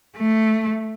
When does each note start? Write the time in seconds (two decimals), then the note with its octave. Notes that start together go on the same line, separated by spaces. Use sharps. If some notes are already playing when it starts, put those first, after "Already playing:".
0.17 A3